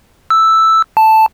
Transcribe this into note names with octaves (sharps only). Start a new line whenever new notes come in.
E6
A5